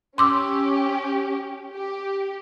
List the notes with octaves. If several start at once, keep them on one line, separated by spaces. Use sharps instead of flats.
C#4 G4 C6 D6 E6
G4